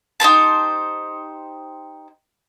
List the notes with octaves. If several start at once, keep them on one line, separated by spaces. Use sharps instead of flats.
D#4 G4 C5 A5